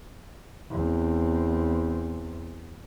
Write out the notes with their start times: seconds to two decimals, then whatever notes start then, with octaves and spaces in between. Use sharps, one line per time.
0.71 E2 C4